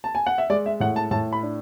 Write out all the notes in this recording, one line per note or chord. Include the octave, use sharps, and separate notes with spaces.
A5
G#5
F#5
E5
G#3 D5
E5
A2 F#5
A5
A2 A5
B5
D4